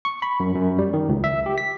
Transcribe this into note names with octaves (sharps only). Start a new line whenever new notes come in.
C#6
B5
F#2
F#2
G3
D#3
C#2
E5
G4
B6